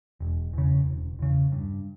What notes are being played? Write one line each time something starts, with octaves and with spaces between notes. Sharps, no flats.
E1
E2 C#3
E1
E2 C#3
G2